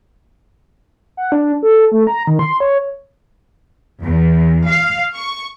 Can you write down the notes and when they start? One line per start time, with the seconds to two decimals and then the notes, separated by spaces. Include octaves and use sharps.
1.17 F#5
1.32 D4
1.63 A4
1.92 A3
2.07 A#5
2.27 D#3
2.39 C6
2.60 C#5
4.03 E2
4.66 F5
5.15 C#6